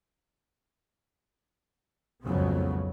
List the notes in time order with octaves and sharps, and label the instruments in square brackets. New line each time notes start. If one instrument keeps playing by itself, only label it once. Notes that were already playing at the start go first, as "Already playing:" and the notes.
[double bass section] B1 F2 G#2 C#3 F#3 B3